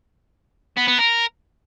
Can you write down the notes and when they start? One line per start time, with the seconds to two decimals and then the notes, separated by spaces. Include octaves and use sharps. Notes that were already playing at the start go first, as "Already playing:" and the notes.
0.77 B3
0.87 B3
0.98 A#4